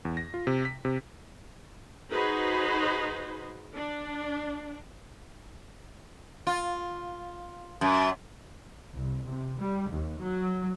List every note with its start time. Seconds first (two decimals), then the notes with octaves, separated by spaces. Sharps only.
0.05 E2
0.17 A#6
0.34 F4
0.47 C3
0.65 B6
0.85 C3
2.09 D#4 F#4 G#4 B4 C5
3.73 D4
6.47 F4
7.81 F#2
8.93 C2
9.27 C3
9.58 G3
9.90 D#2
10.20 F#3